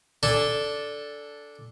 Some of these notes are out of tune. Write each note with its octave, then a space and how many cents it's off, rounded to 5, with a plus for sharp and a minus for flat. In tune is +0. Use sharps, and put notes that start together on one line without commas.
D4 -5 A4 +0 G#5 -30